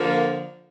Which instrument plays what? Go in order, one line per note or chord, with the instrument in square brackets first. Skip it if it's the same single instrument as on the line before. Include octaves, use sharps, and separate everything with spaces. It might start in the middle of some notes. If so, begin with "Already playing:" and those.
Already playing: [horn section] D3 F3 A#3